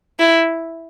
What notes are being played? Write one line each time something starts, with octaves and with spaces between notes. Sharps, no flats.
E4